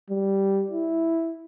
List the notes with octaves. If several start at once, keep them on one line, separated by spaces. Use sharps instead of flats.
G3
E4